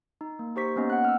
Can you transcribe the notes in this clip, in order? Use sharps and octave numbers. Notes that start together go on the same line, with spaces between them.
D#4
A#3
D#4 G4 C5 C#6 B6
A#3 B3 C#4 D#4 D#5
F#5 F#6
E6 F6